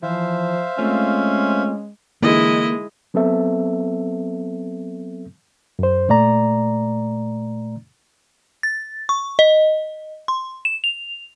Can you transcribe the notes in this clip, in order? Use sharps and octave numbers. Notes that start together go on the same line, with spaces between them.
E3 F3 C5 E5 F5
G#3 A3 C4 C#4 F4
D3 E3 G#3 A#3 D#4 E4 D#5
F#3 B3 C4 A4 E5
F#2 C5
A#2 A3 D5 A#5
A6
C#6
D#5
C6
E7
F7